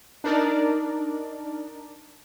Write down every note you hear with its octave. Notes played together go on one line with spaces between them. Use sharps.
D4 D#4 A#4 D5